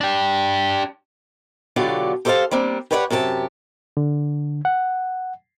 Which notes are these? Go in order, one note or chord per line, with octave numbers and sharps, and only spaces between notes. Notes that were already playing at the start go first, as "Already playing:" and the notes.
D4 G4
B2 D3 F#3 F4 G4 D5
G4 A4 C5 C#5 F5 A5
G3 A#3 C4 D4
G4 B4 C#5 D5 F5 F#5
F#2 C3 G4 G#4 A5
D3
F#5